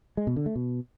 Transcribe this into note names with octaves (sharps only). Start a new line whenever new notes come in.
G#3
B2
D3
A3
B2